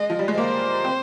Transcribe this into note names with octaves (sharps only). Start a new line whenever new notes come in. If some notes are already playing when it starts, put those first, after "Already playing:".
Already playing: G#3 D#5
F3
G3
G#3
A#3 C5
C4